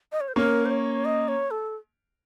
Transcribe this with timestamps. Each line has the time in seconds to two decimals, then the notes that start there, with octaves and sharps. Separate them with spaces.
0.12 D#5
0.20 C#5
0.28 C5
0.36 A#3 C#4 A#4
0.65 C5
0.70 C#5
1.05 D#5
1.28 C#5
1.51 A4